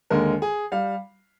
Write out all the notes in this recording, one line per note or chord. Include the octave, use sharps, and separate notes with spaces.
D#2 D3 G#3 A#4
G#4
G3 F5